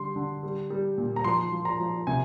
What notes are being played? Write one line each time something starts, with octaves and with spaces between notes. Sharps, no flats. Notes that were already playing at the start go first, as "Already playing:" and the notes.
Already playing: D3 G3 C6
D3
G3
G3
A#2
A#5
F3 C6
F3
A#5
F3
C3 G#5